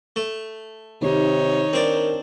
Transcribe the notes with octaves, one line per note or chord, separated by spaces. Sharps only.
A3
C3 D#3 D#4 G4 C#5
C4 D4 A#4 D5